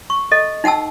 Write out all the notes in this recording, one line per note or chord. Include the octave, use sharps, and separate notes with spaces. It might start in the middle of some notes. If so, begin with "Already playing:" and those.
C#6
A4 D#5
D#4 F#5 G5 A5 E6